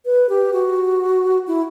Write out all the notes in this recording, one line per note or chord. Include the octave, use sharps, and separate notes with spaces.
B4
G4
F#4
E4